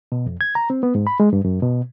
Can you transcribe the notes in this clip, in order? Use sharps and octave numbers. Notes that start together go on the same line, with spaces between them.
B2
F2
G#6
A#5
C4
B3
G#2
B5
G#3
G2
F#2
B2